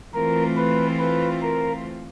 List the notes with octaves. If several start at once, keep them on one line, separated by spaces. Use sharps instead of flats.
E3 A3 C4 F4 A#4
B4
B4
A#4